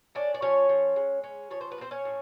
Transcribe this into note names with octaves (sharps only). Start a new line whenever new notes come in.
C#4 D4 D5
D5
F3 C#4 C#5
F3
G#3
C#4
F3 C#5
C5
B4
A#3
C4 C5
C#4 C#5
A2